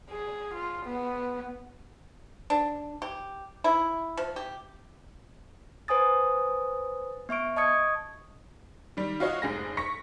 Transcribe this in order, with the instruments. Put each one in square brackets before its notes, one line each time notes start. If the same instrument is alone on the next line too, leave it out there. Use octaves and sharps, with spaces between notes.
[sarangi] G#4
F4
B3
[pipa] D4
G4
E4
F3
G4
[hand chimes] B4 C5 G#5 D#6 A6
B3 E5 C#6 D7
D#5 A5 C#6 D#6 G#6 C#7
[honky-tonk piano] D#3 G3
F4 F#4 C#5 D#5 F5
F1 G#2 G#4 A#6
C#6 A#6 B6 C#7